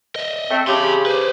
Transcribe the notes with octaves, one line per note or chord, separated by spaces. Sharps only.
D#5 E5
A3 C4
C#3 G4 A5 C6
B4 C5